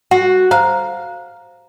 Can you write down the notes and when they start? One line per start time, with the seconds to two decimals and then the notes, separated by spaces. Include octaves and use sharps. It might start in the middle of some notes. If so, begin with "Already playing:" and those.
0.11 F#4 F#5
0.51 C5 F5 A#5